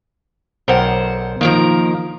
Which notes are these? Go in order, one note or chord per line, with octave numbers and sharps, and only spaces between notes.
B1 A#4 C5 F#5 G5
D#3 F3 A#3 A#4 A#5